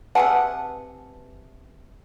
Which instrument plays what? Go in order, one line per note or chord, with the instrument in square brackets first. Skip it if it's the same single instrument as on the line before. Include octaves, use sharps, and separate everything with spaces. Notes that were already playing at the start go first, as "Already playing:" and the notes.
[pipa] C3 G#4 F#5 [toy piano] B4 G#5 A5